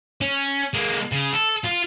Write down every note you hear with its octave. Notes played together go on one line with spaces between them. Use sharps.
C#4
G#3 A#3
C#3
A4
F4